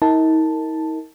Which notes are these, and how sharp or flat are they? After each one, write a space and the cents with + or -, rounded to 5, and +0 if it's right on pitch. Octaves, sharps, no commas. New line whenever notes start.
D#4 +45 A#4 -15 A5 +0